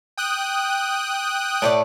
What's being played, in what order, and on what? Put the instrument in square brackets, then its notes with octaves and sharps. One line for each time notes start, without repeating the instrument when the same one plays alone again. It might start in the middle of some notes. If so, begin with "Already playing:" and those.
[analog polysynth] G5 D#6 F#6
[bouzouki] A2 A3 D5